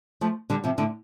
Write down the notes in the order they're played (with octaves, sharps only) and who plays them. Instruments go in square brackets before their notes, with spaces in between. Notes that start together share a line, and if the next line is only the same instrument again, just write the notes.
[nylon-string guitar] F3 A3
D3 G3
C3 F3
A2 D3